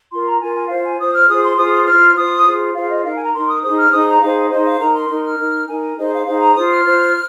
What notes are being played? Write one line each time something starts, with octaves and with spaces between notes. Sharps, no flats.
F4 A#4 C6
A#5
F4 A#4 G#5
G#5
F4 C5 F5
G#5
F4 C5 D#6
F6
F4 G#4 C5 D#6
C6
F4 G#4 C5 D#6
D#6
F4 C5 F6
F4 C5 D#6
F4 G#4 C5
F4 G#4 C5 F5
D#5
D#4 A#4 F5
G#5
A#5
D#4 A#4 C6
D#6
D#4 G#4 C5 D#6
F6
D#4 G#4 C5 D#6
A#5
D#4 G#4 C5 F5
D#4 G#4 C5 D#5
F5
D#4 A#4 A#5
C6
D#4 A#4 C6
F6
D#4 A#4
D#4 A#4 G#5
D#4 G#4 C5 D#5
F5
D#4 G#4 C5 F5
A#5
F4 C5 D#6
F6
F4 C5